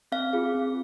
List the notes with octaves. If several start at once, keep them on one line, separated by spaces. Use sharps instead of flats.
C4 F5
F4 G#4
C4